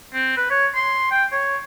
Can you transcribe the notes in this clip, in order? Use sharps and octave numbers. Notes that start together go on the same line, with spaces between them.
C4
B4
C#5
C6
G5
C#5